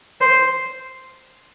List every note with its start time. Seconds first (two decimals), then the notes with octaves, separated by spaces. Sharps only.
0.21 C5